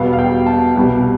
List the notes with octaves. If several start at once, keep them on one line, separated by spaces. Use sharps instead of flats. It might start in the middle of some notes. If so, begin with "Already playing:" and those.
Already playing: E1 E2 B2 G3 B3 F5
F5
G5
A5
C2 B2 G3